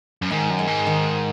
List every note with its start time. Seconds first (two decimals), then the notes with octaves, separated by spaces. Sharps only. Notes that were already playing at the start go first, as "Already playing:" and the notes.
0.22 F#2
0.31 G#2 D#3
0.50 F#2
0.59 G#3
0.67 G#2
0.86 D#3